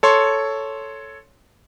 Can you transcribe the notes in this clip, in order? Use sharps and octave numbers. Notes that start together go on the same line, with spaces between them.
A4 C#5 C6